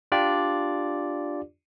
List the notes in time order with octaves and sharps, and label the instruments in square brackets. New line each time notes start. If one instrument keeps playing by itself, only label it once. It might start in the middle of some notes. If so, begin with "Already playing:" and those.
[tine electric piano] D4 F4 G4 D5